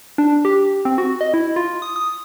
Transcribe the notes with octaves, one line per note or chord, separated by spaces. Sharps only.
D4
G4
C4
F#4
D#5
E4
F4
D#6
D#6